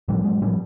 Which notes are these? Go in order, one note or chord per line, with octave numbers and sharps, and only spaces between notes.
A2 F3 G3
A2 F#3 G#3
A2 F3 G3